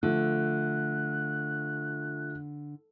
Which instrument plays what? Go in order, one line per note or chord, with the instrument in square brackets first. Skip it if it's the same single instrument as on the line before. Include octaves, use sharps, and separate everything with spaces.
[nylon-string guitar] D3 [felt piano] F3 A3 [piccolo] F#6